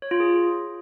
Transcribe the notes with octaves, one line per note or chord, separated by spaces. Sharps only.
C#5
F4
G#4